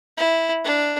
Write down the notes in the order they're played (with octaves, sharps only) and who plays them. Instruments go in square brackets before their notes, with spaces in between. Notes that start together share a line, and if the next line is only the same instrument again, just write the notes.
[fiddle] E4
D4